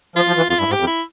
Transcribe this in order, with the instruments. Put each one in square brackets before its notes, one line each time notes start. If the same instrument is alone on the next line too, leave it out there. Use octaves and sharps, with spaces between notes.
[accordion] F3 [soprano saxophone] F4
[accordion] F3
E3
[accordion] F2 [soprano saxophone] F4
[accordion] G2 [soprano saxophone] E4
[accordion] G#2
[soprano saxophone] G4
[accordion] F2
[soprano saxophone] E4